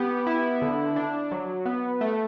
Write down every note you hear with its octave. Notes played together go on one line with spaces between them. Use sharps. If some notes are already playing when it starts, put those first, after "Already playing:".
Already playing: B3 G4
E4
D3
D4
F#3
B3
A3